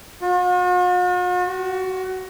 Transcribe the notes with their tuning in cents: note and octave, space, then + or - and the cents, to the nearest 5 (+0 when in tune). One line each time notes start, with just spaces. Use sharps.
F#4 -45
F#4 +20